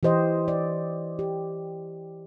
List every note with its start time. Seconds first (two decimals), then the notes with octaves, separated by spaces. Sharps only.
0.03 E3 G4 C5 D#5
0.48 D5
1.19 G4